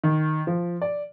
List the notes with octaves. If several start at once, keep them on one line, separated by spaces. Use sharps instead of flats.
D#3
F3
D5